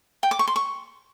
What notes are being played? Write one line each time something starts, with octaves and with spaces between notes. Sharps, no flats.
G5
D6
C#6
C6
C#6